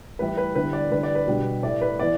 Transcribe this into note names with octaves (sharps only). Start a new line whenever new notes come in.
A2 E3 G3 E4 B4
B4
D3 G3 B3 E4 B4
D5
D3 G3 E4 B4
D5
B4
B2 G3 D4
A2 A3 E4 D5
B4
E3 B3 E4 D5